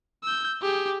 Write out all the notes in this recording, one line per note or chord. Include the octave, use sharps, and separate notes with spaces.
E6 G6
G4 G#4